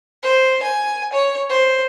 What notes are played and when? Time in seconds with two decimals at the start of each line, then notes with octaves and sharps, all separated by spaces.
0.23 C5
0.63 G#5
1.13 C#5
1.49 C5